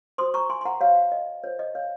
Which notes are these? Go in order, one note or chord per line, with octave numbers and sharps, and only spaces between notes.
F#4 C5 C6 D#6
A#5 C#6
G#5 C6
C6
F#5 A#5
F#4 C5 C#5 F5
D#5
F4 C5 C#5
D#5
C#5 F5